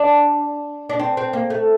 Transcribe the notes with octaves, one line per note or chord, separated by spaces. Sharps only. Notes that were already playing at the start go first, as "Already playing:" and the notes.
Already playing: D4
D4
C4
C4
A#3
A3